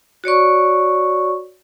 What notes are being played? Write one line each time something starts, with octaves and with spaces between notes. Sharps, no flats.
F#4 C#5 D5 C#6